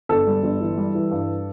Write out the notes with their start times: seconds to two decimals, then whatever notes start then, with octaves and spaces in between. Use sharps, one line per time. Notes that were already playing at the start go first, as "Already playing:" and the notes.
0.09 G1 A4
0.27 G3
0.43 G1
0.61 E3
0.77 G3
0.95 E3
1.11 G2